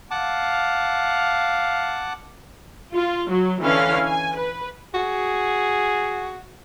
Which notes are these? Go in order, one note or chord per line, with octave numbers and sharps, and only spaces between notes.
F5 F#5 A5 D6
F4
F#3
D3 E3 C#4 F5
G#5
B4
F#4 G#4